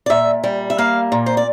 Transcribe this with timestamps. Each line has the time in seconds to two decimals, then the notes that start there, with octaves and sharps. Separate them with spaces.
0.06 D5
0.10 A#2 E5
0.44 G3
0.70 E5
0.78 A#3 F5
1.12 A#2
1.26 C5
1.37 D5